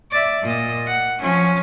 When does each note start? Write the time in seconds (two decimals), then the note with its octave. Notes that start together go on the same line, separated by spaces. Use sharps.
0.11 D5 E5
0.43 A#2 D#5
0.87 F#5
1.21 F3 C#4